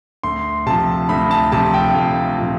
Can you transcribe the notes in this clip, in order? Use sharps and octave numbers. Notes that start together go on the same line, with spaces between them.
D2 C6
C3 F3 A5
D2 B5
A5
C3 F3 A5
G5
D2 F5
C3 F3